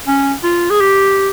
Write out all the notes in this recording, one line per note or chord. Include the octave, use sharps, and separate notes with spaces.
C#4
F4
G#4
G4